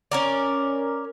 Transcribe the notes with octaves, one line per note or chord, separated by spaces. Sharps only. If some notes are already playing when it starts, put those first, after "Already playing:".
C#4 A#4 D5